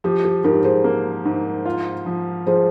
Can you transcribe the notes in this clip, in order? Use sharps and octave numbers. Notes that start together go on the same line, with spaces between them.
F3 G4
G4
G#2 G4 A#4
G#4 C5
A#3
G#2
F4
F3
F3 G#4 C5